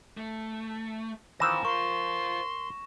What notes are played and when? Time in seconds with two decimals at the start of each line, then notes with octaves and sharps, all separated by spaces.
0.17 A3
1.40 D#3 E3 C4 C5 F5 A#6 E7
1.65 A#4 C6 C#6